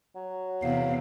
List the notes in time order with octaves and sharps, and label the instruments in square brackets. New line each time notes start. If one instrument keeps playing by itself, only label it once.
[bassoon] F#3
[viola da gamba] E2 C3 [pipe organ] F5